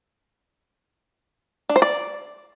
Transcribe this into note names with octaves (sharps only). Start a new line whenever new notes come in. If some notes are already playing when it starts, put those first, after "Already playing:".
D4
C5
D5